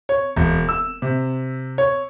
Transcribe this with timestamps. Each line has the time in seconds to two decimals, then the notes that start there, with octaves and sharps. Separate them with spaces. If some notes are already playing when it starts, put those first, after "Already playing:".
0.09 C#5
0.36 E1
0.69 E6
1.02 C3
1.78 C#5